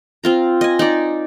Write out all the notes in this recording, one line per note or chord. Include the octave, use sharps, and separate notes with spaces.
C4 F4 A#5
D#5 G#5
D#4 D5